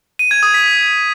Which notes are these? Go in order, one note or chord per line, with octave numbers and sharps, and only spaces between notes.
D#7
G#6
D#6
B6